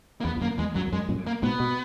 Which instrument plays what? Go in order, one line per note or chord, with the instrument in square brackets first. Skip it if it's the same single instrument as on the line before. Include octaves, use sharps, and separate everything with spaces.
[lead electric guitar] A#3
[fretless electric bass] E2 [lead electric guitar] B3
[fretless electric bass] E2
[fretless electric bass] F#2 [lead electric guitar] A#3
[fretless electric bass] E2 [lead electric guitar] G#3
[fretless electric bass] F#2 [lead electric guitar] F#3
[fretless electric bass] E2
[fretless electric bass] F#2 [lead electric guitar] G#3
[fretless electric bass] F#2 A#2
[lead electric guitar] A#3
[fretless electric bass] G#2 B2 [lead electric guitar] B3
[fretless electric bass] B2